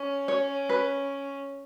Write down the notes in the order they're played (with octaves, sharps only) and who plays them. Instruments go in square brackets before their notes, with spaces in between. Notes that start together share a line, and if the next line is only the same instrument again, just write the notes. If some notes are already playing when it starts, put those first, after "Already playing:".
Already playing: [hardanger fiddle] C#4
[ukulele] C#5
B4